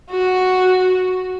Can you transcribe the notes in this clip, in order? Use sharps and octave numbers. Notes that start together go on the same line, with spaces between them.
F#4